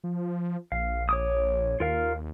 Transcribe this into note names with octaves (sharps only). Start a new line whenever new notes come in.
F3
A#1 F5
C#5 D6 D#6
D#2 F4 A#4 F5